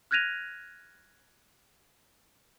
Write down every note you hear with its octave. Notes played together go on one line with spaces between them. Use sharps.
F6 F#6 G#6 A#6 D#7 F7